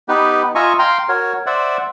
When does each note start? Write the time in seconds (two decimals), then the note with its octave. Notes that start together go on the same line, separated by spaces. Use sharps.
0.09 B3 D#4 G4 B4
0.55 F4 D#5 E5 G#5 A#5 C#6
0.79 F5 G5 A#5 C6
1.09 F#4 A#4 C#5
1.46 C5 D5 E5 F#5